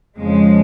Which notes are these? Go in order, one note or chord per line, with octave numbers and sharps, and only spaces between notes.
F2 C#3 F3 G#3